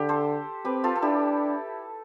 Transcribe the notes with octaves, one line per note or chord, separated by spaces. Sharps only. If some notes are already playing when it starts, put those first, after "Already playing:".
Already playing: D3 G4
A4 C5
C4 G4 B4
F4 A4
A4
D4 E4 G4